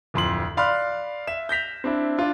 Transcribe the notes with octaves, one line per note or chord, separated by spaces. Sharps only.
D1 F2 C6 F#7
D5 F5 B5 C6 F6 F#6
E5 E7
G6 A#6 B6 F7
C4 D4 E4
D4 F4